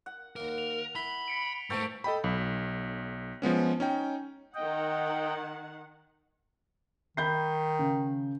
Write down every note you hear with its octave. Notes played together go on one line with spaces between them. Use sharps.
F#5
D#2 A#3 A#4
F7
E4 B5 B6 F#7 G7
B6 C#7 D7
G#2 E3 A3 A4 C5 F#5 G5 C#6
A4 D#5 G5 B5
B1
F3 G#3 B3 C#4
C#4 D#4 G5
D#3 D#5 F#5 G5
D#3 B5 G6 C7
C#3